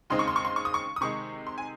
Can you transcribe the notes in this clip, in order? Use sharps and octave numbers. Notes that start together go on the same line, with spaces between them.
D#2 C#3 G#3 C4 D#4 C6
C#6
C6
C#6
C6
C#6
D#6
C#6
D#6
C3 D#3 G#3 D#4 C#6
C6
G#5